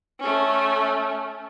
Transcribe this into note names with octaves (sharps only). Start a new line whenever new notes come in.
A3 C#4